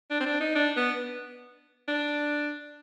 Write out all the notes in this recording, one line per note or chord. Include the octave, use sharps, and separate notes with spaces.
D4
C4
D4
D#4
D4
B3
D4